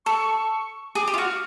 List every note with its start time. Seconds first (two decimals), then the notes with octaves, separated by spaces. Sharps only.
0.06 A4 C#6
0.95 G#4 D6
1.07 G4
1.14 F4
1.18 F#4 F6